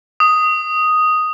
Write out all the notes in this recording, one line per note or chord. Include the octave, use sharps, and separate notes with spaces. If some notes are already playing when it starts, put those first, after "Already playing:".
D#6